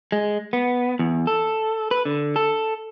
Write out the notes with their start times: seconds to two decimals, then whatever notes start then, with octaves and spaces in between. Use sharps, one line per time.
0.12 G#3
0.53 B3
0.99 E2
1.27 A4
1.91 B4
2.05 D3
2.36 A4